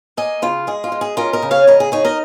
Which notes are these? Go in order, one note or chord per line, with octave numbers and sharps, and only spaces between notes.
A#3 D#5 G#5
C#3 F4
G#3 G#4
F4
G#3
G#4
C#4 F4 A#4
A#4 D#5
C#3
C#5 F5
C#3 A#4 D#5
G#4
D#4 G#4 C#5
A#4 D#5